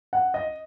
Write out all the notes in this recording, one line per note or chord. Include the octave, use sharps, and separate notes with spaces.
F#5
D#5